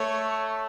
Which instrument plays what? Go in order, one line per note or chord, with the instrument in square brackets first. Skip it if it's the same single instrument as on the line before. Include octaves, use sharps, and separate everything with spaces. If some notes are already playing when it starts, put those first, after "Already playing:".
Already playing: [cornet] A3 [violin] C#5